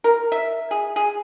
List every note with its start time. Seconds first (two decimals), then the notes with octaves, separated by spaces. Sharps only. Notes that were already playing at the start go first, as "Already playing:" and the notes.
0.04 A#4
0.32 E5
0.71 G#4
0.96 G#4